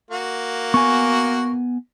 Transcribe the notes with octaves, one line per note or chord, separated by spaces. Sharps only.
A#3 F#4
B3 G#5 C#6